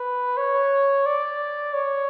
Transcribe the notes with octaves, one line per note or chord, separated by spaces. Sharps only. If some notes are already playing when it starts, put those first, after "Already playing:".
Already playing: B4
C#5
D5
C#5